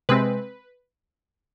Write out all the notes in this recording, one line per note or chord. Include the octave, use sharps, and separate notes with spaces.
C3 G#3 C4 B4